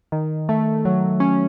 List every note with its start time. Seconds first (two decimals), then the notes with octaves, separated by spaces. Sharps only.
0.12 D#3
0.49 A3
0.85 F#3
1.20 C#4